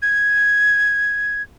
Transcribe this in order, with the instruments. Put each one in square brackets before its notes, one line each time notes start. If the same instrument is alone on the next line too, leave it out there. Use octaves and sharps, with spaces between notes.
[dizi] G#6